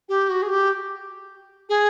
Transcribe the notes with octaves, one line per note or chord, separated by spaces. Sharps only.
G4
F#4
G#4
G4
G#4